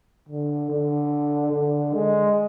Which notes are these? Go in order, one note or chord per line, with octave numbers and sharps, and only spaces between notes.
D3
D3
D3
G#3